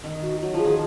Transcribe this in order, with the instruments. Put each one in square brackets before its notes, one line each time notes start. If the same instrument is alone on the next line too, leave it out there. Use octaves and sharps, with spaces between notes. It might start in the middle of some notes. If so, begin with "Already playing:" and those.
[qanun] D#3
[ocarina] F#4
[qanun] F#3 [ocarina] F#4
[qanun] F3 [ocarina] G#4
[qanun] D#3